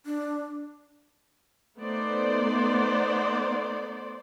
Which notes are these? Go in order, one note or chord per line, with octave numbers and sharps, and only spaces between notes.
D4
A3 B3 D#4 C5 D5